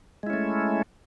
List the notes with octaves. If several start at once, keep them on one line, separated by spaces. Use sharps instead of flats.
G#3 A3 C#4 E4